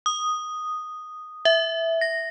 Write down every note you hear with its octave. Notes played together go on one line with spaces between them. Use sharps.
D#6
E5
A#6